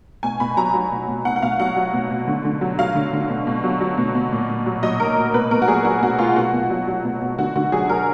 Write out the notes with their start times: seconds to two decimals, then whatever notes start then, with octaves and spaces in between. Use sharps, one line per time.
0.23 B2 G#5
0.40 B2 B5
0.57 F#3 A#5
0.74 F#3
0.91 B2
1.08 B2
1.25 B2 F#5
1.36 F#5
1.42 B2 F5
1.60 F#3 F#5
1.76 F#3
1.93 B2
2.10 B2
2.28 D3
2.45 D3
2.61 F#3
2.79 F#3 F5
2.95 D3
3.13 D3
3.30 B2
3.47 B2
3.64 F#3
3.81 F#3
3.98 B2
4.15 B2
4.32 A#2
4.49 A#2
4.66 F#3
4.82 F#3 D#5
5.00 A#2 A#4
5.17 A#2
5.34 B2 B4
5.51 B2 A#4
5.62 F#4
5.68 F#3 G#4
5.85 F#3 F#4
6.02 B2 F#4
6.19 B2 F4
6.36 B2 F#4
6.53 B2
6.70 F#3
6.87 F#3
7.04 B2
7.21 B2
7.38 D3 F#4
7.56 D3 F#4
7.72 F#3 G#4
7.89 F#3 A#4